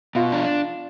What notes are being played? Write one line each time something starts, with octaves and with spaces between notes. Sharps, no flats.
B2 F4
D4